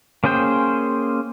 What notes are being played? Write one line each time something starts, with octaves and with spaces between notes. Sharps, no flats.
A#3 C#4 G#4 C5 G5